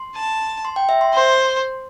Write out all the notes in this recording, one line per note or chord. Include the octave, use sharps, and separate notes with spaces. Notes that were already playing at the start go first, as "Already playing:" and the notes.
Already playing: C6
A5
C6
G5
E5
C6
C5 C6